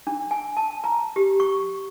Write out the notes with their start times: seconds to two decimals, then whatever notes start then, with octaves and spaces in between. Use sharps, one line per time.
0.07 D4
0.31 G#5
0.57 A5
0.84 A#5
1.16 G4
1.40 C#6